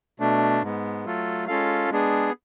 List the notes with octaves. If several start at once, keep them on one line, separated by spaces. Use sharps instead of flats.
B2 A3 D4
G#2 G#3 B3
F#3 A3 F4 A4
G#3 C#4 F4 A4 F5
G#3 B3 D4 G#4